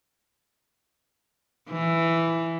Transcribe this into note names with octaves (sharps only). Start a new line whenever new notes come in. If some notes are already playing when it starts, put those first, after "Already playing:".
E3